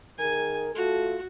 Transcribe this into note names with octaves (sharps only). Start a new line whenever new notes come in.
D#3 G#4 A#4 G#5
A3 F4 F#4 A4